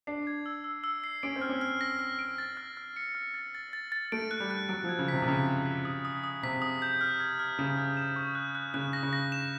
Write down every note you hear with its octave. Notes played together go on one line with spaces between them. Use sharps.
D4 C7
G#6
E6
E6
E6
C7
C#4 D7
C4
F6
C#4
F6
A#6
F6
D7
A6
F6
F6
C#7
F6
A6
A6
A6
A6
A3 D7
F#6
G3
F#6
F#3 D7
F3
G#6
C#3
C3 B6
C3
C#3 G#6
B6
B6
D#6
D#6
D#6
C3 B6
D#6
G6
F6
G#6
F6
C#3 G#6
F6
E7
C#6
F#6
F#6
C#3 F#6
A#6
C#3
A#6
E7